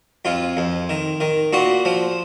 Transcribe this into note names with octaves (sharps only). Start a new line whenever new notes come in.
F2 F4
F2
D#3
D#3
A#2 F#4
F3